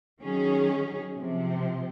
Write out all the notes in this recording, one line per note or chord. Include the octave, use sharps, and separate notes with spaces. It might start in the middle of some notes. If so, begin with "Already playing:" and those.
D#3 F#3 C#4 G#4
C3 F3 C4